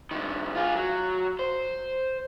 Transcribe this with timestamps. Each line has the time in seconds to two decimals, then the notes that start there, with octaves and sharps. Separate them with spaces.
0.11 G2 D#3
0.55 F4 G#4
0.76 F#3
1.39 C5